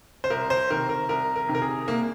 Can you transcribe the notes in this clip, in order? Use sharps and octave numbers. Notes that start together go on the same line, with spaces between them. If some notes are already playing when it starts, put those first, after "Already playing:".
C5
C2 A#4
C5
C3 D#3 A#4
A#4
C2 A#4
A#4
C3 D#3
A#4
G#4
C2 A#3